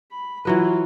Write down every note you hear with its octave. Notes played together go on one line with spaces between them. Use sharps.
B5
E3 F#3 F4 F#4 B4